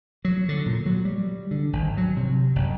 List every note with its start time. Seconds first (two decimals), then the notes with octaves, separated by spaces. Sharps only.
0.25 F#3
0.49 D3
0.66 A#2
0.86 F#3
1.05 G3
1.51 D3
1.73 G#1
1.97 F#3
2.17 C3
2.56 F#1